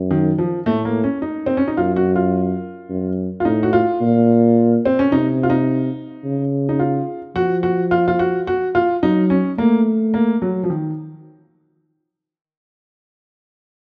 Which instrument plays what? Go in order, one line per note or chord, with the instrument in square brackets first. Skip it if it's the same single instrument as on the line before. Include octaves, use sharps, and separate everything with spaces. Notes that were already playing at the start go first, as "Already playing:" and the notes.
Already playing: [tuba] F#2
[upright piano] D#3
F3
[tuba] A2 [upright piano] A3
[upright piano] A#3
C#4
D#4
C4
C#4
D#4
[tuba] F#2 [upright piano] F4
[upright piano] F#4
F4
[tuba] F#2
[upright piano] F4
[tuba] A2 [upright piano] D#4
[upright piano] F#4
F4
[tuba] A#2
[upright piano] C4
C#4
[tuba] C3 [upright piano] D#4
[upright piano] F4
D#4
[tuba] C#3
[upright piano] D#4
F4
[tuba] F3 [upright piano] F#4
[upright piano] F#4
F4
F4
F#4
F#4
F4
[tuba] F#3 [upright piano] D#4
[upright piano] C#4
[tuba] A3 [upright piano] A#3
[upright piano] A#3
F#3
F3
D#3